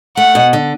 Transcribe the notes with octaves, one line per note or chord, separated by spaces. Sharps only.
A3 F#5
B2
D3